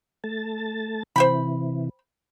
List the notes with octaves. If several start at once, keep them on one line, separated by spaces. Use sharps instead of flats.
A3 A5
C3 E3 C5 G5 B5